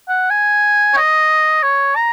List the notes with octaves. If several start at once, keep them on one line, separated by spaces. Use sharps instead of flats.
F#5
G#5
C#5
D#5
C#5
A#5